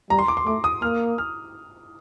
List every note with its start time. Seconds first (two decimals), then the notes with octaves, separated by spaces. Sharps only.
0.10 G3 A#5
0.19 C6
0.28 D6
0.37 C6
0.46 A3 D6
0.64 D#6
0.82 A#3 F6
1.18 F6